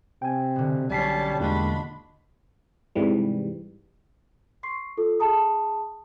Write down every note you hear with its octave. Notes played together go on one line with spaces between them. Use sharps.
C3 G5 G#5
B2 D3
B1 G3 C#4 A5 B6 C7
E2 G#3 A#3 D4 F4 F#4 D#5 B5
G#2 C3 E3 G3
C6 C#6 C7
F4 A4
G#4 A5 A#5 D#6